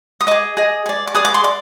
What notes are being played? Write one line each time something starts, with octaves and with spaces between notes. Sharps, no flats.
D#6
G#4 D#5 D6
G#4 D#5
G#4 D5
D6
G#4 D5 D#6
D6
C6
D5 D6